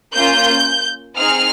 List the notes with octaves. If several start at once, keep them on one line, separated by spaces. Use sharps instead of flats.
A#3 C#4 F4 G6
C4 D#4 G#4 F6